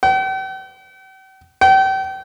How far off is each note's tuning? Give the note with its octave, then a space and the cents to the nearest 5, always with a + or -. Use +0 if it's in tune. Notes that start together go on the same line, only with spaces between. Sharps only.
G5 -45
G5 -35